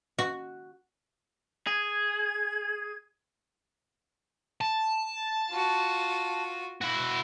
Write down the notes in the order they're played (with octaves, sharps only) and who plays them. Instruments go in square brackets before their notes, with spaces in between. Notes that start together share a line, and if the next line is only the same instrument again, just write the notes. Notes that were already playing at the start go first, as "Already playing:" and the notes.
[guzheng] F#4
[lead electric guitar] G#4 [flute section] G#6
[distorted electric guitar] A5
[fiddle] F4 F#4
[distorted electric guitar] E4 F#4